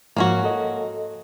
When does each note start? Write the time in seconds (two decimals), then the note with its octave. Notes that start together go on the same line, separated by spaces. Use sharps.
0.16 G#2 F3 A#3 C#4 F#4
0.44 A4 D#5